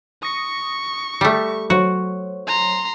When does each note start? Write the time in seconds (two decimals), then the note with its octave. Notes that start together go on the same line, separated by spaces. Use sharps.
0.23 C#6 D#6 A#6 C#7
1.21 G3 A3
1.70 F#3 F#4 C5 C#5
2.47 A#5 C6